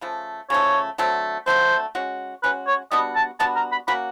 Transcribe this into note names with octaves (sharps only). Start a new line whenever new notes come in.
C#3 F3 A3
C#3 F3 A3 C#5
D3 F#3 A3 C4
D3 F#3 A3 C4 C5
G#3 C#4 F#4
G#3 C#4 F#4 B4
C#5
G3 B3 D4 F#4 D#5
A5
G3 B3 D4 F#4 A5
A#5
B5
A#3 C#4 F#4 B5